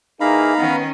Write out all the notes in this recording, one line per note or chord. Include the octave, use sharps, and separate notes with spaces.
E3 A#3 D#4 G#4 F5 A#5 B5
D#3 B3 C#4